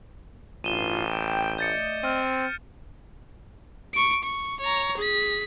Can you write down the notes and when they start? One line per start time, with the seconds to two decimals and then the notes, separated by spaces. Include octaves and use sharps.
0.64 A1 G2 F4 D#7 E7 G7
1.09 G5
1.58 A3 D5 D#5 G6 A6 C#7
2.03 C4 F6 D#7
3.94 C#6 D7
4.24 C#6
4.61 C#5 A#5
4.98 G#4 B6